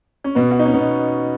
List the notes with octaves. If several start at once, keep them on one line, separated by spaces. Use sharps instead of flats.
C#4
B2 B3
F#4
D#4
C#4
B2 B3